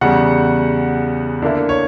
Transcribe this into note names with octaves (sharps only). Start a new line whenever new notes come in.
E2 C#3 G3 F#5
D3 A#3 E4
C#5